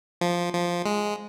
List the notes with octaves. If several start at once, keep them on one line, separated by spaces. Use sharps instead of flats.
F3
F3
G#3